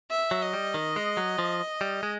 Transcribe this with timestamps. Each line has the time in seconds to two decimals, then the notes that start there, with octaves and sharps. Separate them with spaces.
0.10 E5
0.31 F#3
0.42 D#5
0.53 G3
0.74 D#3
0.96 G#3
1.17 F#3
1.39 F3
1.81 G3
2.03 G#3